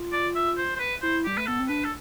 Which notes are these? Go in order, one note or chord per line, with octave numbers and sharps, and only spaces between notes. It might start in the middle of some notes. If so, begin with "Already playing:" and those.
Already playing: F4
D5
E5
C5
C5
B4
E4 C5
G3 G4
A3 B4
B3 A4
C4
D4 B4
A4